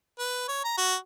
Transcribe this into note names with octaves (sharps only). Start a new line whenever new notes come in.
B4
C#5
A#5
F#4